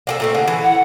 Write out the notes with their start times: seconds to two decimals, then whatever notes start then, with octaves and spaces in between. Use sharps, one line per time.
0.07 A#3 G4 A4
0.20 A#2 A3 C4
0.35 D3 A#3 G#4
0.48 E3
0.63 F#5